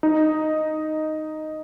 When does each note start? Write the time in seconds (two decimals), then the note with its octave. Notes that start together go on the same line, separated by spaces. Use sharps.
0.03 D#4